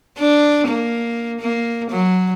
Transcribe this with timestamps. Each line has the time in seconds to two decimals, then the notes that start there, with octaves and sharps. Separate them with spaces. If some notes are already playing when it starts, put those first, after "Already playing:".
0.18 D4
0.68 A#3
1.40 A#3
1.91 F#3